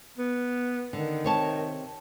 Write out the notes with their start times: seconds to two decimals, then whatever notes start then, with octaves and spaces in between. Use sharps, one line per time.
0.18 B3
0.93 D3 D#3
1.24 C3 C#5 A5